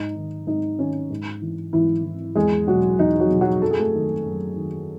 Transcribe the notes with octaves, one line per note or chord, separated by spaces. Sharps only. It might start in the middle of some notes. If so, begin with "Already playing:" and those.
Already playing: G#2 D#4
D#3
G#2 D#4
D#3 C#4
G#2
E3
G#2 E3 E4
E3
E2 G#3 G#4
B2 F#3 F#4
E2 D#4
F#3 F#4
B2
F#3 F#4
F#2 A4
G#4
A3 A4
D#3
F#2
D#3